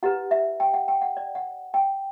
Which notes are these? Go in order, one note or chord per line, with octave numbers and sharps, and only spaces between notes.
E4 G4 B4 F#5
E5
G5
F#5
G5
F#5
D5
F#5
G5